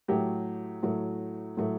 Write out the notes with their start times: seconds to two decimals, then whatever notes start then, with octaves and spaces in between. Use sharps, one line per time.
0.08 A2 F#3 A3 G4
0.83 A2 F#3 A3
1.57 A2 F#3 A3